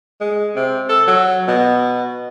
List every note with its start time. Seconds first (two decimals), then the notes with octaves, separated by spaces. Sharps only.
0.20 G#3
0.56 C3
0.89 A4
1.07 F#3
1.48 B2